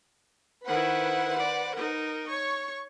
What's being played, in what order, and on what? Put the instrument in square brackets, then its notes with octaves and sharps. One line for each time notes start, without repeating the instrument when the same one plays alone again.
[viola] D#3 E4 [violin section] B4 C5 F#5
[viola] D5
D#4 A#4
[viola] C#5 [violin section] C#6